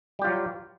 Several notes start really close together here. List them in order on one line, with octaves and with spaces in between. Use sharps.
G3 G4 F4 F#3